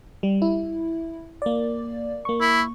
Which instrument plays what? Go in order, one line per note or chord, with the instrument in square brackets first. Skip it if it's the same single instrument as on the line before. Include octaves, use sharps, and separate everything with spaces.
[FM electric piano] G3
E4
A#3 D5
A#3 C#6
[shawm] E4